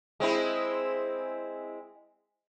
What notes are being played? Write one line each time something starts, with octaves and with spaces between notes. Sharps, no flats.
G#3 C4 E4